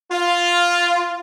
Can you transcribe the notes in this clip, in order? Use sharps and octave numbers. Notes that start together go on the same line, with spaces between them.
F4